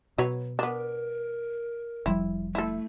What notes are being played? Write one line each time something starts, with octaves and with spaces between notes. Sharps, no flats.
B2 F#3 B4 C#5
B3 D4 A#4
F1 F3 G3 E4
A3 E4 A4